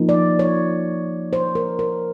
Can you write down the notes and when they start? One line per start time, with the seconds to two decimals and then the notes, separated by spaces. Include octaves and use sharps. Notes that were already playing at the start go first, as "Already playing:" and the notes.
Already playing: F3 A#3 D#4
0.09 D5
0.39 C#5
1.33 C5
1.55 A#4
1.79 A#4